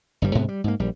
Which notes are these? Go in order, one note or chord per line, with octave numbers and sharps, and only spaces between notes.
G1 G2 G3
D2 G#2 C3 B3
G3
G#2 A#3
A#1 G3